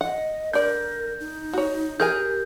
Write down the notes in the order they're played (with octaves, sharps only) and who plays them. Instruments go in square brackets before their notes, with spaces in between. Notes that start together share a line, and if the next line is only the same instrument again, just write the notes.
[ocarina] D#5 [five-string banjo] F#5
[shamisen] D3 D5 [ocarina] A#4 [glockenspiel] G6
[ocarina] D#4
[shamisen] F#4 C#5
[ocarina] G4 [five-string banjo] G#4 A#4 G#5 [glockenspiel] G6